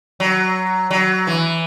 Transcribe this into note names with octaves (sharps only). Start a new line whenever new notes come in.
F#3
F#3
E3